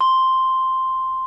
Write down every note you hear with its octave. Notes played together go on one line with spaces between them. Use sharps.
C6